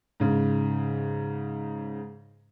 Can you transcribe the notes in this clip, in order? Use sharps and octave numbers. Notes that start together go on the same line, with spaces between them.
G#2 C#3